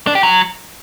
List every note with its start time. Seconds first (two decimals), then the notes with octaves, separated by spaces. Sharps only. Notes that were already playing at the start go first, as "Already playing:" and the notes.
0.07 D4
0.15 G4
0.23 F#3